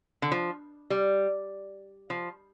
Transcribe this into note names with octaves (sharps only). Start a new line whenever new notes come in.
D3
F3
G3
F3